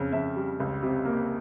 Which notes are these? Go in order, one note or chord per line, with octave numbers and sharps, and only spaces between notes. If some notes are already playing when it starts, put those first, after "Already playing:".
Already playing: F2 C#3
F2 E5
G3
C#2
C3
A#3